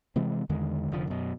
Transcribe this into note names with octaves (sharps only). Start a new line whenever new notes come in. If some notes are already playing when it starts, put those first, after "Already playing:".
C3 E3 G#3 C4
E2 D3 D#3 G#3
F1 D3 F3
F#2 B2